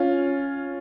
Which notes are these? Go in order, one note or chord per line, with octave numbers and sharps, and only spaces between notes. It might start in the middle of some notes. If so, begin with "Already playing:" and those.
Already playing: C#4 F4